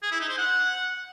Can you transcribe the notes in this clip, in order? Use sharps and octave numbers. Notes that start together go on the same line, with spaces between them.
G#4
E4
D#4
C5
F#5